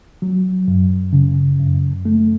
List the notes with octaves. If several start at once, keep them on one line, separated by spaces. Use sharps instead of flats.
F#3
F#2
C#3
F#2
A3